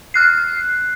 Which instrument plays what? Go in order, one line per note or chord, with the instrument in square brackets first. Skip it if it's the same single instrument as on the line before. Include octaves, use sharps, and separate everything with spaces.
[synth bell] F6 F#6 C7